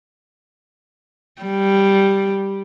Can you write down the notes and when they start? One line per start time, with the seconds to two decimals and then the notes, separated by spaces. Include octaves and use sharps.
1.42 G3